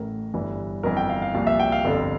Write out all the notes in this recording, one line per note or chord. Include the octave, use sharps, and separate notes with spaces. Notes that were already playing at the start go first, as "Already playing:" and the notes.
Already playing: A1 A2 E3 A#4
G1 G2 E3
G1 F2 E3 A#4
G5
F5
F5
C2 A#2 F3 F5
E5
G5
F5
G1 F2 D3